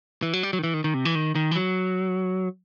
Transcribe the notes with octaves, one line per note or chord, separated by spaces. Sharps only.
E3
F#3
G3
F#3
D#3
E3
D#3
D#3
C3
E3
D#3
D#3
E3
F#3